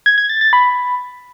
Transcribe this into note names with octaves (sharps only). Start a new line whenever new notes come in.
G#6
G#6
A6
A6
B5